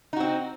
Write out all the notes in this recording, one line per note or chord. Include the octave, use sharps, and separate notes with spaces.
C4 D#4 F#4